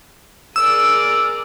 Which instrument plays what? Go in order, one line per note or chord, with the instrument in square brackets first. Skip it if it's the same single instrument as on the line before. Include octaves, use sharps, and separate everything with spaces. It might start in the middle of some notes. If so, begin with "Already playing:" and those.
[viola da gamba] G#4 A#4 D5 [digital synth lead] E6